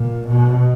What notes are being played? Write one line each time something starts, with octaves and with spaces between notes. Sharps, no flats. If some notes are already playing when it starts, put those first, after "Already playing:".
Already playing: A#2
B2